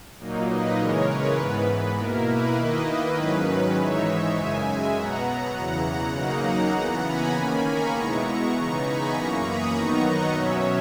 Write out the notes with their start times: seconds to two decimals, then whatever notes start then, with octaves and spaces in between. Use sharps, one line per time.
0.19 A#2 F#3 A#3 D#4
0.48 B4 D#5
0.78 C#3 E3 G#3 A#4 C#5
1.08 B4
1.37 G#2 E3 B3 B4
1.68 B4
1.97 B2 A#3 E4 A#4
2.28 B4
2.57 D#3 A#3 E4 B4 D#5
2.88 B4
3.17 G#2 D#3 F#3 C#4 B4
3.77 G#2 E3 G#3 D#4 C#5 E5
4.36 F#2 C#3 G#3 E5 G#5
4.66 E5 G#5
4.95 B2 F#3 B3 F#5 A#5
5.55 E2 C#3 E3
5.86 F#5 A#5
6.15 C#3 F#3 A#3 D#4 F#5 A#5
6.45 F#5 A#5
6.75 C#3 E3 B3
7.04 G#5 B5
7.35 D#3 A#3 C#4 G#5 B5
7.64 A#5 C#6
7.94 B2 G#3 B3 E4 A#5 C#6
8.53 C#3 E3 B3 D#4
8.84 G#5 B5
9.13 F#2 E3 A#3 A#5 C#6
9.43 B5 D#6
9.73 D#3 F#3 B3 D#4 A#5 C#6
10.03 D#5 F#5
10.32 B2 F#3 C#4 C#5 E5